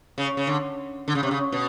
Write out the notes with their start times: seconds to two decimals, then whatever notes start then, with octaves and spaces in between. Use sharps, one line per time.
0.18 C#3
0.37 C#3
0.47 D3
1.08 D3
1.15 C#3
1.23 C3
1.31 C#3
1.52 B2